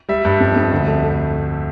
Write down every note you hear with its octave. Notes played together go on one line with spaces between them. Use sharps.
G3 E5
G2
F2
F2
D2
A3